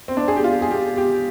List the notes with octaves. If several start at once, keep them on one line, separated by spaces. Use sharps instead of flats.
C4
D4
G#4
G4
F4
G#4
G4
G4